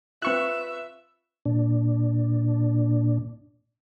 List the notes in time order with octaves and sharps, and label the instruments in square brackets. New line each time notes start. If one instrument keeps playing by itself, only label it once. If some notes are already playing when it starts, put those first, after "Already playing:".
[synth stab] C4 C#6 F#6 [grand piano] F4 B4 [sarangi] E5
[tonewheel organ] A#2 D4